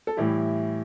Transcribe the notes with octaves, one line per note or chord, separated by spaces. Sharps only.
A4
A2 E3 G3 E4 G4